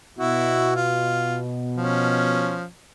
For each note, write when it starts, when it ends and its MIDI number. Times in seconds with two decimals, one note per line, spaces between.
0.18 2.60 47
0.18 0.74 64
0.18 0.74 66
0.76 1.38 65
1.77 2.64 53
1.77 2.64 61